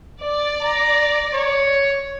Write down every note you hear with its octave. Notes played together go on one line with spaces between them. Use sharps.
D5
A#5
C#5